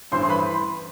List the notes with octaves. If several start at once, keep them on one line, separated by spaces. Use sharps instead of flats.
A1 G2 E3 C5 C6
C6
B4 B5